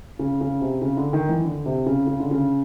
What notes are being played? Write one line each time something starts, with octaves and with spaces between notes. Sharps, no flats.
C#3
C#3
C3
C#3
D3
D#3
E3
D3
C3
C#3
C#3
D3
C#3